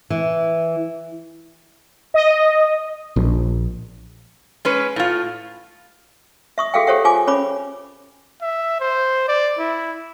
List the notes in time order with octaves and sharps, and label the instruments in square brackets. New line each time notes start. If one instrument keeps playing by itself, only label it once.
[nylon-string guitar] E3
[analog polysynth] D#5
[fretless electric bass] A#1
[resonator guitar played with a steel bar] G#3 C#4 B4
A2 F4
[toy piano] E5 C#6 D#6
F#4 G#4 A4 E5 F5 G5
G4 A4 C5 C#5 E5 F#5
F4 G#4 G#5 D6
C#4 C#5 B5 D6
[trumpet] E5
C5
D5
E4